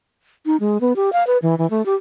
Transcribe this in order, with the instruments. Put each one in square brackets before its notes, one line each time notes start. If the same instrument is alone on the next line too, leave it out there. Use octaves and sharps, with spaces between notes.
[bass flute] D#4
G#3
B3
G4
F5
B4
E3
E3
A3
G4